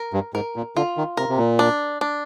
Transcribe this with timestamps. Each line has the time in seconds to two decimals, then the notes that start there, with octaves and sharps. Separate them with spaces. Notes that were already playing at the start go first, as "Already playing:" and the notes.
Already playing: A#4
0.13 G2
0.34 G#2 A#4
0.56 A#2
0.76 D3 F4
0.97 D#3
1.17 C3 A#4
1.29 C3
1.38 A#2
1.59 D4
2.01 D4